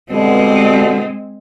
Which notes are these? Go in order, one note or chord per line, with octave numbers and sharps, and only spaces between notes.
G2 B2 D3 G#3 C4